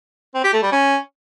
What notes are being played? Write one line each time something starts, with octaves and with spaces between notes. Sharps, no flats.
C4
G4
A3
G3
C#4